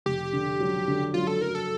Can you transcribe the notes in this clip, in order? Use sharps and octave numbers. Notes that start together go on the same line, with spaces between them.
F1 G4
D3
F#3
D3
F#3 F4
A4
F#3 A#4
A4